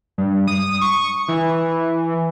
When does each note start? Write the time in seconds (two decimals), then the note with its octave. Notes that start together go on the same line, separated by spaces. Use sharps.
0.18 G2
0.48 D#6
0.81 C#6
1.28 E3